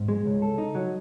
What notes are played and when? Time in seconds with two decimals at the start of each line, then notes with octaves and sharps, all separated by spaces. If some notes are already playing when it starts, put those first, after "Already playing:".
Already playing: G#2
0.08 G#3
0.26 C#2
0.42 A4
0.58 D#4
0.75 F#3